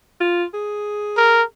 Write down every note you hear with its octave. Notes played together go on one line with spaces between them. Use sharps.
F4
G#4
A#4